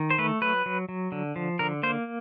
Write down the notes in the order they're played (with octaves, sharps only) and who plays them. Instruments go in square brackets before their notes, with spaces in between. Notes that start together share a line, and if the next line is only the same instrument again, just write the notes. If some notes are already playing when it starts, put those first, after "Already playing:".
Already playing: [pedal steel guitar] D#3
C5
A3 B4
F#3 B4
F#3
F#3
D3
F3
D3 A#4
A#3 C5